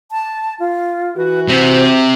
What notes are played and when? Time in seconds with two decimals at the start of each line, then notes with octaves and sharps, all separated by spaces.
0.11 A5
0.60 F4
1.17 E3 F#4 B4
1.49 C3 C5